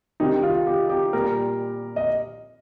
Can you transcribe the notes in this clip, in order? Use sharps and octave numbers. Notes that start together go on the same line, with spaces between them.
C3 D#3 G3 D#4
F4
G4
G4
A#2 G3 A#4
D#5